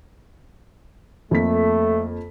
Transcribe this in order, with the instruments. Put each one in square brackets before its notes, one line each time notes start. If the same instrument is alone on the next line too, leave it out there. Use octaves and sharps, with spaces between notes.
[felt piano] F2 A#3 B6 [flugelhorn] A3